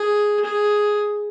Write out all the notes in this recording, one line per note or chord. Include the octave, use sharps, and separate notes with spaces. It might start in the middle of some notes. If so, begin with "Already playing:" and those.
Already playing: G#4
G#4